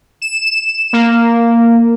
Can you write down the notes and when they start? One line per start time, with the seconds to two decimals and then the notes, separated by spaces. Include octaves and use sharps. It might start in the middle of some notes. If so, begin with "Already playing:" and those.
0.22 E7
0.93 A#3